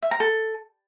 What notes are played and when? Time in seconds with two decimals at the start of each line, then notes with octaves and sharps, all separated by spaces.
0.03 E5
0.11 A#5
0.20 A4